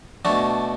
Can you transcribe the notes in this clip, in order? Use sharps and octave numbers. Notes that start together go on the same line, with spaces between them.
B2 A3 D4 F#4